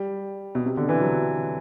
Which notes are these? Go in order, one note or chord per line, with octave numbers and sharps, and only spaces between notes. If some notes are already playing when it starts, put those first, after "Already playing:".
Already playing: G3
B2
C3
D3
E3
F#3